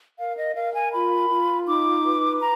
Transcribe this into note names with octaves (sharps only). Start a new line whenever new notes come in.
A#4 F5
D#5
A#4 F5
G#5
F4 B5
F4
D#4 D6
B4
A#5